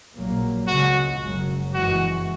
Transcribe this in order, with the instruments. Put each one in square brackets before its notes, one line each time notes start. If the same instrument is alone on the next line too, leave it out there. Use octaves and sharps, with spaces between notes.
[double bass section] A#1 A#2 F#3 A#3
[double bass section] C#2 C#3 G#3 [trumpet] F#4
[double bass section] F#1 F#2 C#3 F#3
[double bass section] F#1 F#2 E3 G#3 [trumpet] F#4